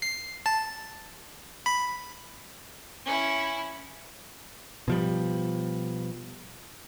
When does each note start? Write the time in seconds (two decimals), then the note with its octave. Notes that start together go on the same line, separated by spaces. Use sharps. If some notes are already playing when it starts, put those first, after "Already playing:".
0.02 C7
0.46 A5
1.66 B5
3.05 C#4 E4
4.88 B2 F3 G3